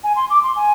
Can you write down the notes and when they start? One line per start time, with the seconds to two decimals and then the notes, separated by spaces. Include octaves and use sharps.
0.03 G#5
0.15 C6
0.30 D6
0.43 C6
0.55 G#5